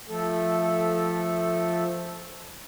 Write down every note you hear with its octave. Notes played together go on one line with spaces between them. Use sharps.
F3 A3 A4